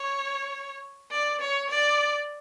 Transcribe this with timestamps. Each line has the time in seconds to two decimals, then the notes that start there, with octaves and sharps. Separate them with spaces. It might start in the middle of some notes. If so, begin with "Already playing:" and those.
Already playing: C#5
1.11 D5
1.41 C#5
1.70 D5